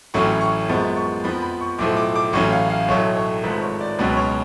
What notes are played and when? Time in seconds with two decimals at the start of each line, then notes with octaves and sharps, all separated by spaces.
0.14 A1 A2 F#3 C#4 C#6
0.41 C#6
0.69 F#2 F3 G#3 B3 C#6
0.97 C#6
1.24 F2 F3 B3 B5
1.42 B5
1.61 C#6
1.78 B1 A2 F3 D6
1.97 D6
2.16 D6
2.33 A1 A2 F#3 C#4 C#6
2.52 F5
2.70 F5
2.88 B1 A2 F#3 A3 C#5
3.16 C#5
3.43 G#1 G#2 F3 A3 B4
3.62 C#5
3.81 D5
3.99 C#2 B2 F#3 C#4 B4
4.17 C#5